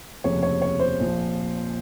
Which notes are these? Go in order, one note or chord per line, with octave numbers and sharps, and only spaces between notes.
F1 D#2 C#3 F3 C#5
C#5
C#5
C5
A#1 A#2 F3